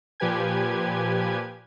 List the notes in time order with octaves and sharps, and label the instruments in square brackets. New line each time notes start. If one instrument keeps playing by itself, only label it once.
[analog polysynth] A#2 F3 G4 B4 G#5 G#6